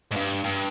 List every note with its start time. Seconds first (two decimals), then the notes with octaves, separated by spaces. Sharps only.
0.11 G#2
0.16 G2
0.44 G2